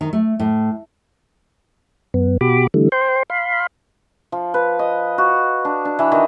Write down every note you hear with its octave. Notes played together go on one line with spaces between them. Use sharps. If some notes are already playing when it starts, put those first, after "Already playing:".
D#3
A3
A2
F#2 B3
B2 F#4 G4 B5 D6
D3 E3 G3 A3
C5 G5 C6
F5 B5 C6
F3
B4
D#5
F#4
D4
D4
E3
D#3